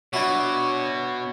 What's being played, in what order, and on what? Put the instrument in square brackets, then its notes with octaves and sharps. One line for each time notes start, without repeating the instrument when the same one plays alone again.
[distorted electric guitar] B2 [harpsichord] D4 E4 F#4 [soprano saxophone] C#5